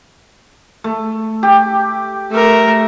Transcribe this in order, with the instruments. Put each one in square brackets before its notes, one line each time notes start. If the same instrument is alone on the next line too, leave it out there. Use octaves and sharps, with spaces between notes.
[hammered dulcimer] A3
G4
[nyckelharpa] A3 A#4